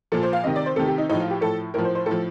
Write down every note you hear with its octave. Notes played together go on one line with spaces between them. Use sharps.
A#2 F3 A4
C5
F5
C3 D#3 D#5
D5
C5
C3 D#3 A4
G4
D#4
A2 F3 D#4
F4
G4
A2 F3 A4
A2 F3 A#4
C5
C5
A2 F3 A4